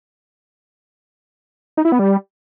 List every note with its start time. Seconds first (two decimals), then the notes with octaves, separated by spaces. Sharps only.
1.77 D#4
1.85 E4
1.92 B3
1.99 G3